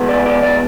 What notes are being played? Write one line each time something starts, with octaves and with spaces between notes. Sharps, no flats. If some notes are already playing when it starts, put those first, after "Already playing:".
Already playing: E2 B2 G#3 B3
D5
D5
D5